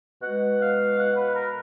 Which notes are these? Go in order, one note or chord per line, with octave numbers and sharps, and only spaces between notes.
B2 G#3 F#5
F5
F#5
B4
A#4